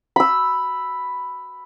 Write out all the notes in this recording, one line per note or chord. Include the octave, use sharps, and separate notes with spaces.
B5 E6